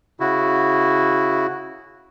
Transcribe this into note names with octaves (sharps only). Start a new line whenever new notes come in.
C#3 E4 F#4